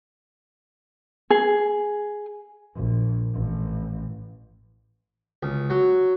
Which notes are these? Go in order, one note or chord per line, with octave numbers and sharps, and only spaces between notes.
G#4
A#1
A1
C#2
F#3